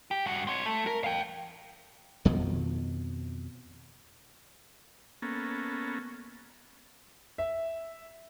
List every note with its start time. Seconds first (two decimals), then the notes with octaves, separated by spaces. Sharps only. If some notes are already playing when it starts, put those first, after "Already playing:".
0.11 G4
0.26 G2 F#4
0.47 C4 C#5
0.66 A3
0.87 A#4
1.04 F5 G5
2.25 F2 B2 D#3 F3
5.22 A#3 B3 C#4 A4
7.38 E5